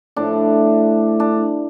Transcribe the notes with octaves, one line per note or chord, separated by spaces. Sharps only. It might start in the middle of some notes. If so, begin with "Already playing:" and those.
A2 F3 A3 D4
D4